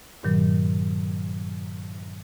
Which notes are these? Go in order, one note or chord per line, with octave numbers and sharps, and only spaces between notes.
G2 A#2 D#3 F#3